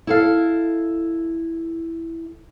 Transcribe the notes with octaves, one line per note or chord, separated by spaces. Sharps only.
E4 A4 F5